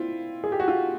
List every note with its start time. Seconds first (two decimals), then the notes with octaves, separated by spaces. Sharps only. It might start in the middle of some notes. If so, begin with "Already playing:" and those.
Already playing: C4 E4 F4
0.44 G#4
0.52 G4
0.60 F#4
0.68 F4